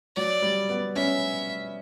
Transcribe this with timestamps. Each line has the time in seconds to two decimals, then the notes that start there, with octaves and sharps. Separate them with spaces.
0.16 F#3 D5
0.42 G3
0.70 B3
0.96 C#4 E5